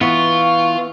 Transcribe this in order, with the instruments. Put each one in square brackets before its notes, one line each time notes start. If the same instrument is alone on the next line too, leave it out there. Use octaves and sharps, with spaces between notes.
[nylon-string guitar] E3 [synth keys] B3 [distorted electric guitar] F4 [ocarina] C#6